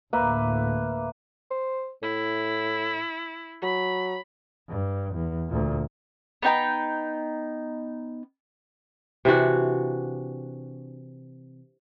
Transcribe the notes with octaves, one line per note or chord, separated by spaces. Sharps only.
D2 A2 A#3 B4 E5
C5
A2 E4
F#3 B5
G2
E2
D2 A#2
B3 D#4 G5 A#5
C3 E3 D4 F#4